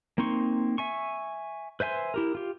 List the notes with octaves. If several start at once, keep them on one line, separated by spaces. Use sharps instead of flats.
A#3 C4 D#4 C6 C#6
E5 G#5 C#6
B4 C5 E5 G#5 C6
E4 G4 A#4
F4 G4